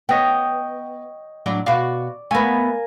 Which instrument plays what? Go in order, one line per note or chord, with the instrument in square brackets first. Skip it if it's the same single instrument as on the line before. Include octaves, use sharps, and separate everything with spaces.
[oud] B3 [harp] C#5 D#5 G5
[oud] A2 F#3 D4
[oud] B2 F#4 F5 [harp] D5
[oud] A3 B3 [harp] A#4 F5 G#5